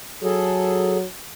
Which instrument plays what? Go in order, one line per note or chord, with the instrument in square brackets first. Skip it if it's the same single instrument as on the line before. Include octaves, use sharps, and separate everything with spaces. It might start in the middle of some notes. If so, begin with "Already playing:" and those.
[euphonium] F#3 [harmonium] G#4 A4